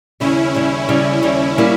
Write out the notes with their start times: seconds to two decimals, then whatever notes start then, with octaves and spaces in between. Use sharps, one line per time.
0.20 D#2 C#3 G3 C#4 E4
0.55 D#2 C#3 G3
0.89 D#2 C#3 G3
1.22 D#2 C#3 G3
1.58 G3 A#3 E4